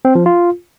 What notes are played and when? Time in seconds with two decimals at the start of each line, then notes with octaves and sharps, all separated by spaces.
0.05 C4
0.15 F3
0.26 F4